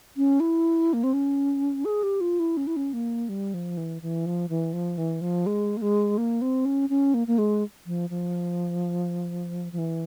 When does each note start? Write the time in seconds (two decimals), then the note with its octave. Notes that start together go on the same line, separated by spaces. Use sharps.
0.17 C#4
0.40 E4
0.93 A#3
1.04 C4
1.13 C#4
1.85 G#4
2.03 G4
2.21 F4
2.40 E4
2.57 C#4
2.67 E4
2.76 C#4
2.93 A#3
3.29 G3
3.54 F3
3.77 E3
4.02 E3
4.26 F3
4.49 E3
4.73 F3
4.98 E3
5.21 F3
5.46 G#3
5.77 A#3
5.82 G#3
6.18 A#3
6.42 C4
6.65 C#4
6.90 C#4
7.14 A#3
7.27 A#3
7.38 G#3
7.86 F3
8.10 F3
9.72 F3
9.78 E3